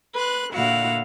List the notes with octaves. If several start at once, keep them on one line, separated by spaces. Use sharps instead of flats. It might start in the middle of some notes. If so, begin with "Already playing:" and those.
B4 C6 F#6
A#2 D3 E4 F#4 F5 F#5